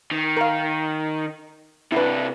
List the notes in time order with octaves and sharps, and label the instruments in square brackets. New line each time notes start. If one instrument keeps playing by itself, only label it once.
[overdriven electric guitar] D#3
[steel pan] A#4 F5
[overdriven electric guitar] C3 D4 [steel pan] E4 B4